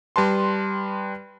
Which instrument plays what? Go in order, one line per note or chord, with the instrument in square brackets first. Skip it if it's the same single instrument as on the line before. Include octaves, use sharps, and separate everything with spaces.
[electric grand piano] G3 B4 A5 C6